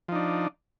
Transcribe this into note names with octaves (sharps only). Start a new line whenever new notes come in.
F3 D4 D#4